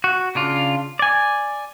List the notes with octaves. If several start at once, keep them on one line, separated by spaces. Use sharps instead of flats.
F#4
C#3 D4 F4
D5 G#5